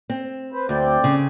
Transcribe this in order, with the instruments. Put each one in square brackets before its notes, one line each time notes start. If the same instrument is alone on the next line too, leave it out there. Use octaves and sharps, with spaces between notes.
[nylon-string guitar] C4
[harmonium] B4 C5
[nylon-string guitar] D2 [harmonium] C4 D5 G5
[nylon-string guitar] C#3